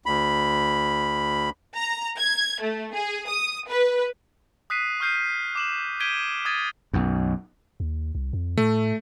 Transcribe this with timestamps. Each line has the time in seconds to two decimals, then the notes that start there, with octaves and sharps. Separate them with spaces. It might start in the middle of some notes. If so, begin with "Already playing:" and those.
0.06 D2 B5
1.76 A#5
2.19 G#6
2.61 A3
2.93 G#4
3.29 D#6
3.68 B4
4.70 D#6 F#6 B6 C7 D#7
5.00 C#6 F6 G6 C7 D#7
5.55 D6 E7 F#7
6.00 G6 G#6 B6 D7 D#7 G7
6.45 D#6 G#6 A6 D#7
6.93 B1 F#2
7.80 D#2
8.15 C2
8.33 F2
8.57 A2 A3